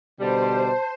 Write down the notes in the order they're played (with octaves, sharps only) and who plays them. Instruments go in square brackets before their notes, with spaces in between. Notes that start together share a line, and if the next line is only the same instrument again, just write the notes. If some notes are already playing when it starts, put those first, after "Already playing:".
[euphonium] B2 [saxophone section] D3 G3 [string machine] C5 [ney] A5